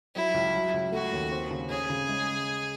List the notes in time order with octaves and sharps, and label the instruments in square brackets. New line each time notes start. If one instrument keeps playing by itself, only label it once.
[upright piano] F#3 [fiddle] E4
[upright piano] C#2
F#3
C#2
[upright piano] A3 [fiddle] F#4
[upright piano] D#2
C4
C#3
[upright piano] C#4 [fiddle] G#4
[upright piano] C#3
G#3